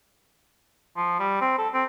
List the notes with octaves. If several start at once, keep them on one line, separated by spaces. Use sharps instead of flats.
F3
G3
C4
A4
C4